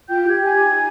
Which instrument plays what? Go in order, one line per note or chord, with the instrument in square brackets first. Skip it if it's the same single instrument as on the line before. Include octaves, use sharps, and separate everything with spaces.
[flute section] F4 G5 G6
G4 G#6
D#4 G#5 G#6
D#4